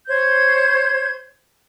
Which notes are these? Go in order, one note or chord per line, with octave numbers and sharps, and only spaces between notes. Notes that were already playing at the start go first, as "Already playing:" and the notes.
C5 C#5 G6 G#6